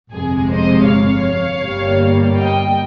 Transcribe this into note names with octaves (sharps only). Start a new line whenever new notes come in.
G1 F2 C3 F3 G#3 G#4
C5 D#5
C#5 F5
G1 G2 G3 A#3
D#5 G5